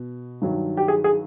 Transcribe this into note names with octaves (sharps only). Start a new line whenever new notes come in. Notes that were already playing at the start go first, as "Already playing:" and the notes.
Already playing: B2
G2 D#3 F#3
G4
G#4
G#4